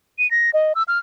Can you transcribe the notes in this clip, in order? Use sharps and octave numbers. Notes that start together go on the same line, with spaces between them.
D#7
A#6
D#5
E6
F6